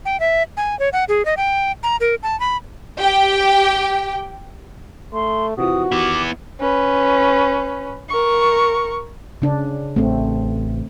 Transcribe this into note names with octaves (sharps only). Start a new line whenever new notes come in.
G5
E5
G#5
C#5
F#5
G#4
D#5
G5
A#5
A#4
A5
B5
G4 G5
A3 C6
C3 E3 F3 F#4 D#6
D#3 B3 E4 G4 D6
C#4 B4
A#4 C#6
C#3 D4
A1 A3 C4